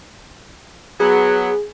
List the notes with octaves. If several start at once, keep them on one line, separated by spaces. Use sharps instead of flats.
F#3 B3 G#4